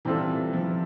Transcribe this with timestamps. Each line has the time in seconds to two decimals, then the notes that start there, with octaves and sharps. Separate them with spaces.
0.05 C3 E3 G3 C4 F4 A4
0.53 F3